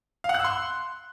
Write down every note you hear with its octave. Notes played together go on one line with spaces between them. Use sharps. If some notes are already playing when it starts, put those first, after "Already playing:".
F5
F#5
F#6
E6
C6